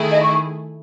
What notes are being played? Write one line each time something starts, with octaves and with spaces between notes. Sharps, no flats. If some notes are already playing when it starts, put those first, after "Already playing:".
Already playing: D#3 A3 E4 G#4
D#5
C#6